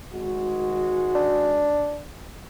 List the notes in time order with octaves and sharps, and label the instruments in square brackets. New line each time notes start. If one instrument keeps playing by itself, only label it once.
[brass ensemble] G#1 G#3 F#4
[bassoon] D4